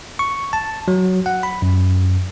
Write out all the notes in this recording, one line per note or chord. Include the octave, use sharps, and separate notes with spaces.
C#6
A5
F#3
F#5
B5
F#2